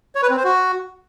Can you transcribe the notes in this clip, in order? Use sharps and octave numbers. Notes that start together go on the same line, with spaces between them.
C#5
B4
C4
C5
F#4